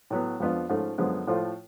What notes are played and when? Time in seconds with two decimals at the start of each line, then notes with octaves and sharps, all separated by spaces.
0.11 A2 F#3 B3
0.40 F2 F3 B3 D4 F4
0.69 G#2 F3 A3 C#4
0.98 F#2 D3 F3 G#3 B3
1.27 A2 F3 A3 F4